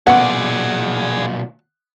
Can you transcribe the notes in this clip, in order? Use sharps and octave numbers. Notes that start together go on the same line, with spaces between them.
B1 A#2 A3 B3 G#4 D5 F#5